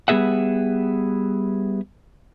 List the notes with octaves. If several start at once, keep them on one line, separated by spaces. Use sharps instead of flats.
G3 B3 C4 G#4 E5 F#5